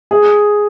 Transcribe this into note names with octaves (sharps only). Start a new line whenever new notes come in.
G#4